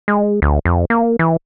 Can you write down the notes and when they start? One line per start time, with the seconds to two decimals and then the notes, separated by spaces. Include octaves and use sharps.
0.08 G#3
0.42 D2
0.65 F2
0.90 A#3
1.19 E3